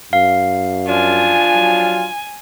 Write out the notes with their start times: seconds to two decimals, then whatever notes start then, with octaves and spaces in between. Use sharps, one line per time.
0.13 F#2 F5
0.87 F3 D4 F4 G#5
1.54 F#3